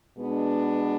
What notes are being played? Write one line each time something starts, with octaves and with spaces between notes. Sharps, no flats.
B2 G#3 B3 D4